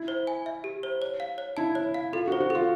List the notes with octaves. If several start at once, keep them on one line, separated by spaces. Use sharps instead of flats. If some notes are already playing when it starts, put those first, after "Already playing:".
Already playing: E4
C5
G#5
E5
G4
C5
C#5
F5
C#5
E4 A5
C#5
F5
F4 A4
F#4
C5
F#4
F4 A4